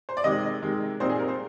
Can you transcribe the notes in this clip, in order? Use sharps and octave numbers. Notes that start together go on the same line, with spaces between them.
C5
D5
C3 D#3 G#3 D#5
C3 D#3 G#3
A#2 G3 C4 D#4 C5
G#4
A#4
C5